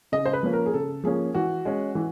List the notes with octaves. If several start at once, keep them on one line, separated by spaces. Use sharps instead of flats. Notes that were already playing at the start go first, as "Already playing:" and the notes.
C#3 D#5
C5
B4
F3 A#3 C#4
A#4
G#4
C#3 A4
F3 A#3 C#4 G#4
E3 F#4
G#3 C#4
E3